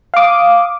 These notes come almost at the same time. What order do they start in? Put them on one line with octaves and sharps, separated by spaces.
F5 D6 D#6